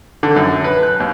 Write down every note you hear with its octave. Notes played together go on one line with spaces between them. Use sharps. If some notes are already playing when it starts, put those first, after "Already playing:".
D3
F#2
B4
F#6
D#2